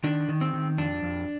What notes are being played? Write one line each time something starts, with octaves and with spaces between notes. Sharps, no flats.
D#3 D4
D#3
C4
D#3
F2 D4
F2